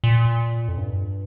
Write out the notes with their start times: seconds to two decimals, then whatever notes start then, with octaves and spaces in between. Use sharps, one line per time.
0.04 A#2
0.68 F2
0.77 G2